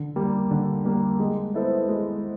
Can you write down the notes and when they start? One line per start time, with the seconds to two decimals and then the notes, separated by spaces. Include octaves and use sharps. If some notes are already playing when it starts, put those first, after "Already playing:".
Already playing: D3
0.16 G3 A#3
0.51 D3
0.85 G3 A#3
1.20 G#3
1.54 B3 E4 A4 C5
1.88 G#3